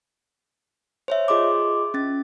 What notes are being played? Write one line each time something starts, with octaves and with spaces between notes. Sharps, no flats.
C5 C#5 E5
F4 G#4 D#5 C6 D6
C#4 A6